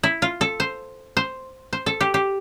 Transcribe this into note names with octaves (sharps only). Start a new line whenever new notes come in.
E4
F4
A4
C5
C5
C5
A4
G4
G4